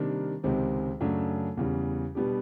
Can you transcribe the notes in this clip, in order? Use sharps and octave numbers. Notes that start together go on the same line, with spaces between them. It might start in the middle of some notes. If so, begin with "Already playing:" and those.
Already playing: C3 D#3 G3 A#3 D4
C#2 C3 D#3 G#3 C4
F#2 C#3 F#3 A3 D4
E2 C#3 E3 G3
B2 G3 B3 D4 G4